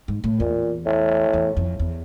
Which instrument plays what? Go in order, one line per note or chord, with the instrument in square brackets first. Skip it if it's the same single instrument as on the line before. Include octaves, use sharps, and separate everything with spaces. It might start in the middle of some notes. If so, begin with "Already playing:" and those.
[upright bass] G#2
A2
[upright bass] E2 [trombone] A#2
[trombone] A2
[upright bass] E2
F2
E2